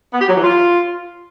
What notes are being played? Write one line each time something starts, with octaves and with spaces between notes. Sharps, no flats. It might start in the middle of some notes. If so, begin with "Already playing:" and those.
B3
G4
F#3
E3
F4